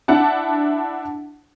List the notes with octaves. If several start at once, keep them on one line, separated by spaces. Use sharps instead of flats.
D4 E4 F#5 A5